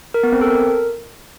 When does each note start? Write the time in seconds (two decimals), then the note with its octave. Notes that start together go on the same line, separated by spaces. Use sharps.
0.14 A#4
0.23 B3
0.32 C4
0.41 A4
0.51 A#4